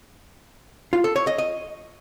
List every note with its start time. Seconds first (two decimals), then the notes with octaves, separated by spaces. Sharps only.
0.93 F4
1.04 A4
1.16 C#5
1.27 D#5
1.38 D#5